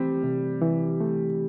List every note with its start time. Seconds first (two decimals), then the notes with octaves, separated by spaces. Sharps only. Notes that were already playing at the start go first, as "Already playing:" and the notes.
Already playing: E3 G3 A3 C4
0.24 C3
0.62 E3
1.01 A3